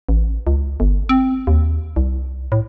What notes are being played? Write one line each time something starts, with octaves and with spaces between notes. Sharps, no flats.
A1
C#2
G1
C4
D#2
C2
A2